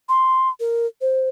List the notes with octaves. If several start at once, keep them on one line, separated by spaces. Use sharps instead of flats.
C6
A#4
C5